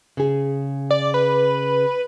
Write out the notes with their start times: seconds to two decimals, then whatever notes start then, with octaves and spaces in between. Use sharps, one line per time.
0.17 C#3 G#4
0.91 D5
1.14 B4